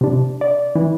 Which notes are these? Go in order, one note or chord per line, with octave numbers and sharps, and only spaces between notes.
C3 D4
D5
E3